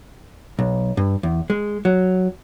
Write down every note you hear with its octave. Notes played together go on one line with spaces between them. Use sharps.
B1
G2
E2
G#3
F#3